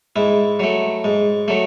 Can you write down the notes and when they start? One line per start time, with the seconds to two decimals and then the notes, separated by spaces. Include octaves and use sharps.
0.16 G#2 E4
0.60 F#3 A3
1.04 G#2
1.48 F#3 A3